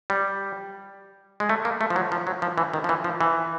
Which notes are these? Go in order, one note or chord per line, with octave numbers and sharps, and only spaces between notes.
G3
G#3
A3
A#3
A3
F3
F#3
F3
F#3
F3
E3
D#3
F3
E3
F3
E3